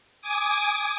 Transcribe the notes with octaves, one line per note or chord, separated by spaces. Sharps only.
G#5 D6 D#6